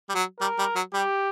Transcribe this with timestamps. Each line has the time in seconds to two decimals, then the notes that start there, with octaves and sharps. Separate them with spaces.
0.09 G3
0.14 F#3
0.40 G3 A#4
0.58 G3
0.76 F#3
0.93 G3 G4